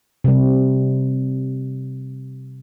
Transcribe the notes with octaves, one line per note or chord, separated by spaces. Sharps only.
C3 G3